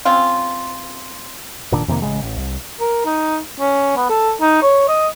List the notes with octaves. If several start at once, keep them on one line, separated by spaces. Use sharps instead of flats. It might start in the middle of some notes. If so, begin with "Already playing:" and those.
C4 C#4 F4
F1 A#2 D#3 D4
F2 C3 D#3 A#3
A1 C#3 G#3
A1
C2
A#4
D#4
C#4
B3
A4
D#4
C#5
D#5